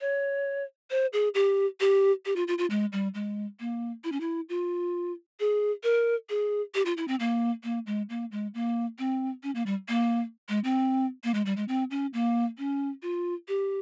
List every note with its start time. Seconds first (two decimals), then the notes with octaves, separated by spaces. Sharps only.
0.01 C#5
0.91 C5
1.13 G#4
1.34 G4
1.80 G4
2.25 G4
2.36 F4
2.48 F4
2.58 F4
2.70 G#3
2.93 G3
3.14 G#3
3.60 A#3
4.04 E4
4.12 C#4
4.20 E4
4.49 F4
5.40 G#4
5.84 A#4
6.30 G#4
6.74 G4
6.85 F4
6.97 E4
7.08 C4
7.20 A#3
7.64 A#3
7.86 G#3
8.10 A#3
8.32 G#3
8.54 A#3
8.99 C4
9.43 C#4
9.55 A#3
9.66 G3
9.88 A#3
10.49 G#3
10.64 C4
11.24 A#3
11.34 G#3
11.46 G3
11.57 G#3
11.68 C4
11.91 C#4
12.13 A#3
12.58 C#4
13.02 F4
13.48 G4